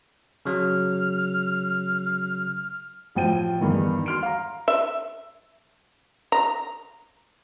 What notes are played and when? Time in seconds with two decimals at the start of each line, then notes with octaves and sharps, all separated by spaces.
0.45 C#3 F#3 F6
3.15 A1 F3 G5 D#7
3.60 E2 G2 D#3 E3
4.06 C6 F6 D7
4.23 F5 A#5
4.68 E5
6.32 A#5